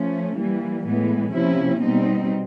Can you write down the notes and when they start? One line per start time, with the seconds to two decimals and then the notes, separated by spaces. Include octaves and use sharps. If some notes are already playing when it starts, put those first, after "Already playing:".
Already playing: F3 A3 C#4
0.37 E3 G3 A#3
0.85 A2 E3 G#3 B3
1.33 C3 F3 A#3 C#4 E4
1.81 B2 G3 C4 D#4